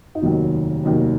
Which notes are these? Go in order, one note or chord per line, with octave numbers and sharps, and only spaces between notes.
D#4
F1 D#2 D#3 F#3 F4
F1 D#2 D#3 F#3